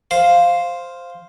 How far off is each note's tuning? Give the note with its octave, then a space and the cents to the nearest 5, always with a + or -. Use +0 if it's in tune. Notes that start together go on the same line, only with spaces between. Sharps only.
C5 +0 F5 +0